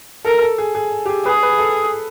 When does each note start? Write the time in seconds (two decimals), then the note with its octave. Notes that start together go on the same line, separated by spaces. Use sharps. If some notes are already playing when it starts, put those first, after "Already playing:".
0.25 A4 A#4
0.42 A4
0.58 G#4
0.75 G#4
1.06 G4
1.09 G#4
1.25 G#4 B4
1.43 B4
1.59 A4